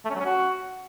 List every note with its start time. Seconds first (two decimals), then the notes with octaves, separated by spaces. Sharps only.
0.05 A3
0.10 C#4
0.15 F#3
0.20 C#4
0.25 F#4